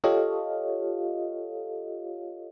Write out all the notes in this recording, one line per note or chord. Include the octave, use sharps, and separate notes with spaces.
F4 G4 A4 C#5 D#5 F5